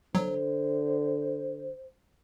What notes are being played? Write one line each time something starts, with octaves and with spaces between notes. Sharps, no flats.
D3 F#3 C5